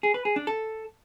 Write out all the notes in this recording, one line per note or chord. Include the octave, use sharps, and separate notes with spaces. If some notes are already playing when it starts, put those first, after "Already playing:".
G#4
B4
G#4
D4
A4